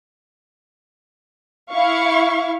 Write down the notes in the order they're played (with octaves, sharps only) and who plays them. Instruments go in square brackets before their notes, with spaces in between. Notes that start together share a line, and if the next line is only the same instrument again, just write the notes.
[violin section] E4 F5 C#6